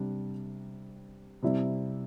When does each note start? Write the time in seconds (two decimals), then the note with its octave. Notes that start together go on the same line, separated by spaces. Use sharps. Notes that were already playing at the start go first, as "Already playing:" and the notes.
Already playing: C3 G3 D4
1.42 C3 G3 E4